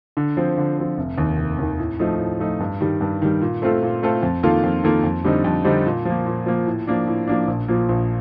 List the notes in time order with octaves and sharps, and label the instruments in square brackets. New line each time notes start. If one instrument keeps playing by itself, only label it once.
[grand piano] D3
F3 C4
D3
F3 C4
F1
D#2 D#3
F1
D#2 D#3
A2
F3 A3 D#4
A2
F3 A3 D#4
G2
D#3 G3
G2
D#3 G3
A#2
A3 C4 F4 A4
A#2
A3 C4 F4 A4
F2
D#3 A#3 F4 A4
F2
D#3 A#3 F4 A4
F2
D3 G3 C4 D#4
F2
D3 G3 C4 D#4
A#2
F3 A#3
A#2
F3 A#3
A2
F3 A#3 D4
A2
F3 A#3 D4
A#1
A#2 F3 A#3
A#1